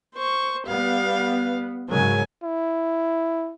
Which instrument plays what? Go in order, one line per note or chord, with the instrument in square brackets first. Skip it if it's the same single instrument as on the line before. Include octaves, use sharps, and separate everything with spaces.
[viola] C5 C#6
[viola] G3 F5 [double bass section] B3
[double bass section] G#2 C#3 F#3 [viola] A#4 G#5
[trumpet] E4